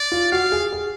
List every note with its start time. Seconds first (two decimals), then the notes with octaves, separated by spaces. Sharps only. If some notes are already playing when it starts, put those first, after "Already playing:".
Already playing: D5
0.12 F4
0.32 F#4 F5
0.52 G#4
0.73 G#4